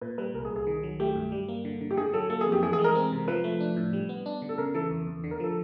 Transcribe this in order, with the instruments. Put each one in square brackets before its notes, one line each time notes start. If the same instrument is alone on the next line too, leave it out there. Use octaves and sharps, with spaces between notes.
[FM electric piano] A#2 [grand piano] B4
[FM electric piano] G3 [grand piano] B4
[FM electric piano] C2 [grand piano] A#4
[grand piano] G#4
[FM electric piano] C2
[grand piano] G#4
[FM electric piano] D#3
F#3
[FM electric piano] A3 [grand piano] G4
[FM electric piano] G2
G3
A#3
D3
D3
[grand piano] G4
[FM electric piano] D3 [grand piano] G#4
[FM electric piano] F#3 [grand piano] A4
[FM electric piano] A#3 [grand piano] A4
[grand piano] G#4
[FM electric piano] F2
[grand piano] G4
[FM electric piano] E3 [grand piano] G#4
[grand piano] G#4
[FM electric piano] G#3
[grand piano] A#4
[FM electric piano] C4
C3
[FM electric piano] F3 [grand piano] B4
[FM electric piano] A3
D4
A2
G3
B3
D4
D3
[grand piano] A4
[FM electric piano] C#3 [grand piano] A#4
[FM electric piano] E3 [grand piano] A4
[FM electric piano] E2
E2
D3
[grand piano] A#4
[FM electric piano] F3 [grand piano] A4